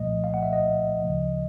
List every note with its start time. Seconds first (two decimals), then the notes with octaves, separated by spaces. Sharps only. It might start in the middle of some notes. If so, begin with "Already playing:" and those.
Already playing: C2 A#2 F3 A3 D#5
0.24 F5
0.34 F#5
0.43 E5
0.53 D#5
1.02 D2 C#3 F3